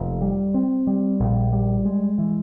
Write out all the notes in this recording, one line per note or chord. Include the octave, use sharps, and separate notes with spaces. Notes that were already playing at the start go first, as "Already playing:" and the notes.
Already playing: F1 A#3
G3
C4
G3
A#1
G3
G#3
E3